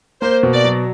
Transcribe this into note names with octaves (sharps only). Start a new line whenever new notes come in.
A#3 C5
B2
D5
F#3